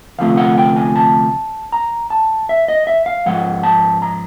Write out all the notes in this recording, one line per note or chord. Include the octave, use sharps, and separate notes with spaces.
D2 C3 F3 A3 F5
F#5
G5
G#5
A5
A#5
A5
E5
D#5
E5
F5
G#2 F3 G#3 F#5
A5
A#5